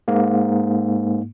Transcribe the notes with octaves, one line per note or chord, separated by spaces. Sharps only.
G#2 A#3